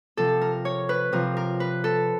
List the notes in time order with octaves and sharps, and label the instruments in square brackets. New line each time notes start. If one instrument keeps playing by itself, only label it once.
[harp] C3 F3 A4
A#4
C#5
B4
C3 F3 A#4
A#4
B4
A4